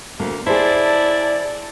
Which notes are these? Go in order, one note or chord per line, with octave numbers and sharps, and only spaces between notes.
D2 A#3
E4 G#4 C5 D5 A5